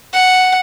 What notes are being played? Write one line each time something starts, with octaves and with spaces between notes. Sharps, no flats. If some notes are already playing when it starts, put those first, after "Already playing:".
F#5